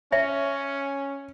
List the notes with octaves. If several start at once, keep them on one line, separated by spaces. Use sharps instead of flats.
C#4 C#5 E5